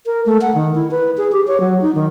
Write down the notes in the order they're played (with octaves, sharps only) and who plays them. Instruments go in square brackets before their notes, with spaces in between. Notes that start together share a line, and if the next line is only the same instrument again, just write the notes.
[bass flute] A#4
A3
F#5
D#3
E4
B4
G#4
G4
C#5
F#3
D#4
D#3